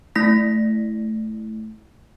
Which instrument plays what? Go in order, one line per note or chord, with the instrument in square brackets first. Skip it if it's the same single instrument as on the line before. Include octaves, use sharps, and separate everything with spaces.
[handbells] A3 E4 A#6 B6